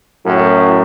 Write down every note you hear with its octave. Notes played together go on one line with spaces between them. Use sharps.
F#2 A2